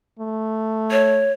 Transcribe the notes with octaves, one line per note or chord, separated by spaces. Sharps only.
A3
C#5